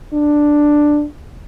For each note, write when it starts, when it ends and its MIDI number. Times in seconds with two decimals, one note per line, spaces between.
0.13 1.05 62